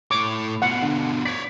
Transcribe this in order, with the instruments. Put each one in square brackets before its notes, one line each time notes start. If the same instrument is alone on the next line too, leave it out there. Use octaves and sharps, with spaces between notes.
[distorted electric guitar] A2 C#5 [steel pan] D6
[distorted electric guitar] B2 F4 [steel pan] F#5
[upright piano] D3
[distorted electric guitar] C#5 D5 [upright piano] B6